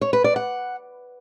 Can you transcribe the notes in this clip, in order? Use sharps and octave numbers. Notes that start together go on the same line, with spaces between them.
C#5
B4
D5
F#5